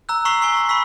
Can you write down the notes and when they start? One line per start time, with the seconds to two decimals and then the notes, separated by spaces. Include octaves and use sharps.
0.09 A#5 E6 F#6
0.25 A#5 C#6 E6 B6 C7 F#7
0.42 G#5 C#6 C7 G7
0.54 A#5 C6 C7
0.69 B5 C#6 E6 B6